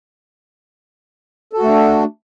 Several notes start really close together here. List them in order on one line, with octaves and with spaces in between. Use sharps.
A4 F#4 A3 D4